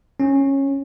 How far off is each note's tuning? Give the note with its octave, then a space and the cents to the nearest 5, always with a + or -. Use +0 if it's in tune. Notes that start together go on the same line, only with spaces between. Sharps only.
C#4 -15